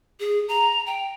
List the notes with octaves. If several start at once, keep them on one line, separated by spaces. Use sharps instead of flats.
G#4
A#5
G5